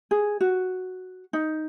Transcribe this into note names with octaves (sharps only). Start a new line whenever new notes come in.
G#4
F#4
D#4